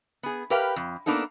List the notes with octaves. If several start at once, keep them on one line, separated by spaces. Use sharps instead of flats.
B3 G#4
G4 A#4 B4 F5 G5
F2
A#3 B3 D4 D#4 A4